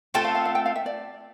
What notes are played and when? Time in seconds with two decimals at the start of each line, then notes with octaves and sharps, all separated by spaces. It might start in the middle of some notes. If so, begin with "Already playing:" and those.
0.14 A3 C4 F4 A4 G5
0.24 F5
0.35 F5
0.45 F5
0.55 G5
0.66 F5
0.75 E5
0.86 D5